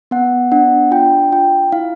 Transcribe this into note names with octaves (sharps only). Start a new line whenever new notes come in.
B3 F#5
D4 F#5
F4 G5
F4 G5
E4 F5